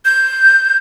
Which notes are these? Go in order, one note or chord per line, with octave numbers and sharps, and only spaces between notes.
G6